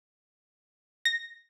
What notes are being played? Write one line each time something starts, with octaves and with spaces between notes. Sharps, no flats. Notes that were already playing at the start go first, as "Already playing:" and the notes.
A#6